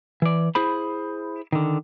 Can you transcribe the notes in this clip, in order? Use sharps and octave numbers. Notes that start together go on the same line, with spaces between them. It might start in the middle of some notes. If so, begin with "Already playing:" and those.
E3 D5
E4 G#4 C5 B5
D3 D#3